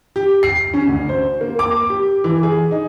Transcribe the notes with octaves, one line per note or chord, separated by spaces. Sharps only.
G4
C7
C#4
D2
C5
A#3
D6
G4
E3
G#4
D#4